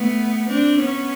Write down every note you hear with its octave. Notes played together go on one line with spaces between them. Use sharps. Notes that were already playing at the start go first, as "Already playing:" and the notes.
Already playing: A3 B3
C4 D4
B3 C#4